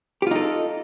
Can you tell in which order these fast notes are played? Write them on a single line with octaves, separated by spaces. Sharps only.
G4 F4 D#4 A4